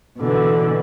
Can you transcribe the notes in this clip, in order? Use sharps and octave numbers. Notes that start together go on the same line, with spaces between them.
B2 D3 E3